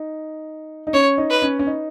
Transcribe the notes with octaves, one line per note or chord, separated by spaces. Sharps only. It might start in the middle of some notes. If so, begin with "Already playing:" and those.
Already playing: D#4
D#4
C#4 C#5
D#4
B4
C#4
C#4
D#4